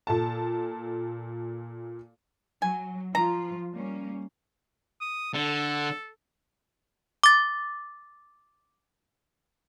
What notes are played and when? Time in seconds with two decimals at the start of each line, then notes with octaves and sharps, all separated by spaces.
0.07 A#2 A4 A5
2.62 F#3 G#5
3.15 F3 F4 A#5
3.73 G3 A#3 C#4
5.01 D#6
5.34 D3 A4
7.24 D6 A6